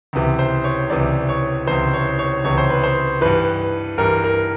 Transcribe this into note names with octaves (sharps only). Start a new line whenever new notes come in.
C#2 C3 E3
C5
C#5
C#2 C3 E3 D5
C#5
C#2 C3 E3 C5
C#5
C#5
C#2 C3 E3 C#5
C5
B4
C5
G2 E3 B4
G2 E3 A#4
A#4